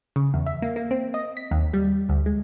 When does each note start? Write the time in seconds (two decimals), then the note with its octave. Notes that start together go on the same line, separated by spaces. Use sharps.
0.16 C#3
0.34 E2
0.46 E5
0.62 A#3
0.76 A#3
0.91 C4
1.14 D#5
1.37 B6
1.51 D#2
1.73 G3
2.09 D2
2.26 G#3